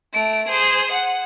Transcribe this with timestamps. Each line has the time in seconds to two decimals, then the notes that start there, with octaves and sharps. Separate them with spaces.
0.14 A3 D7
0.48 G#4 C5
0.92 F#5